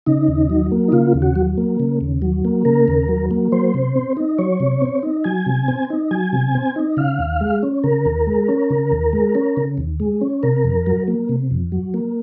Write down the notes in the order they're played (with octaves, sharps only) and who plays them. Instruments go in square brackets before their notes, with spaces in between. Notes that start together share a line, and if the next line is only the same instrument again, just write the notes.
[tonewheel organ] C#3 D#4
D#2
F#3
A#3
D#4
C#3 F4
D#2
F#4
F#3
A#3
C#3
D#2
F#3
A#3
C#3 A#4
D#2
F#3
A#3
F#3 C5
C3
C4
D#4
F#3 C#5
C3
C4
D#4
F#3 G#5
C3
C4
D#4
F#3 G#5
C3
C4
D#4
C#3 F5
D#2
G#3
C#4
C#3 A#4
D#2
G#3
C#4
C#3
D#2
G#3
C#4
C#3
D#2
G#3
C#4
C3 A#4
F2
F#3
A#3
C3
F2
F#3
A#3